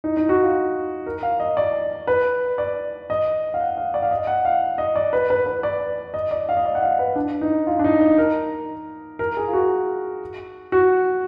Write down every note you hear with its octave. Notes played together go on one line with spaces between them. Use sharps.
D#4
D#4
F#4
F4
A#4
F5
D#5
D5
B4
D5
D#5
F5
F#5
F5
D5
F5
D#5
F#5
F5
D#5
D5
B4
B4
B4
D5
D#5
D5
F5
D#5
D5
F#5
F5
B4
D4
D#4
F4
D4
D#4
D#4
A#4
A#4
G#4
F4
F#4
F#4